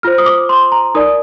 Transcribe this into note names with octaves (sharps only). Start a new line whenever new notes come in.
F4 C5 F6
D#6
D6
C6
A#5
D#4 A#4 D5 D#6